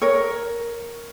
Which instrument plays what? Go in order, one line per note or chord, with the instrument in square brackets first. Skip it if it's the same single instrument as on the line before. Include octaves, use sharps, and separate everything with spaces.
[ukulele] A#4 C#5